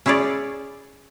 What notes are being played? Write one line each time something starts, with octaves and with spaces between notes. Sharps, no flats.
C#4 E4 G#4 C#5 D5